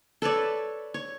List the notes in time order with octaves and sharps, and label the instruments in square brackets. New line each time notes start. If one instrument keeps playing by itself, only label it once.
[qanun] A4 B4 C#5 D5
C#5